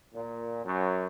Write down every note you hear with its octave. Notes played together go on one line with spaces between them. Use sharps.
A#2
F#2